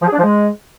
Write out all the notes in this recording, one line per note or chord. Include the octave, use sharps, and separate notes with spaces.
F3
G#4
D4
F3
G#3